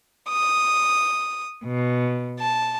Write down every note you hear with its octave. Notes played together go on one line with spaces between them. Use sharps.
D#6
B2
A5